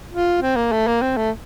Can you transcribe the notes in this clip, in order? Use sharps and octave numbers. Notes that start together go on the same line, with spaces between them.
F4
C4
A#3
A3
A#3
C4
A3